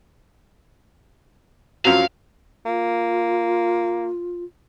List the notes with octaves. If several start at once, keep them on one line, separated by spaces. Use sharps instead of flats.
F#2 F3 F#3 F5
A#3 F4